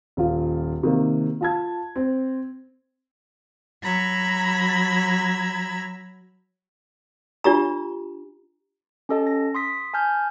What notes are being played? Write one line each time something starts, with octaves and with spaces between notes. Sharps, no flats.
D#1 F4
C3 D#3 A#3
F4 A5 G#6
C4
F#3 A#5 B5 E6 G#6
D4 F4 G4 A#5
C#4 G4 A4 D#5 A5
A#6
C6 D#6 B6
G#5 A5 F6 G6